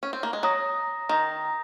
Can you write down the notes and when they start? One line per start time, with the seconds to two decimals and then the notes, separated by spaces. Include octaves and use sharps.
0.03 C#4
0.13 C4
0.23 A#3
0.33 G#3
0.43 F#3 A#5 D#6 A#6
1.09 D#3 A#5 D#6 A#6